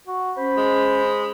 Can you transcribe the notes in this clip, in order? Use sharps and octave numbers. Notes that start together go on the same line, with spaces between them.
F#4
C#4 C5 B5
G#3